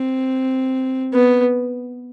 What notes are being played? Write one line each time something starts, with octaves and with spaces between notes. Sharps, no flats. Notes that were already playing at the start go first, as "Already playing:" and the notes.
Already playing: C4
B3